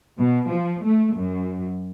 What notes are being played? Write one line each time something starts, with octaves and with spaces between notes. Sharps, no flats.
B2
F3
A3
F#2